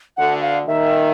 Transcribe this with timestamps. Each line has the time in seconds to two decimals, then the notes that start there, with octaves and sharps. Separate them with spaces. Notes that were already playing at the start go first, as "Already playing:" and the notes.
0.17 D2 D3 F#5
0.42 F5
0.67 D#2 D#3 E5